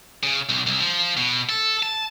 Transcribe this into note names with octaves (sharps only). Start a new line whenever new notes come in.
C#3
B1
C2
F3
B2
A4
A5